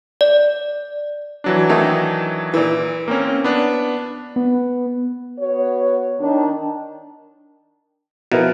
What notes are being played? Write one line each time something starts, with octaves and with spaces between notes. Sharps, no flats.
D5
E3 F#3 D4
D#3 A3 D#4
A#2 E3
A#3 C4 C#4
B3 D4
B3
B3 F#4 C#5
D#3 D4
B2 F3 E4 F4 A#4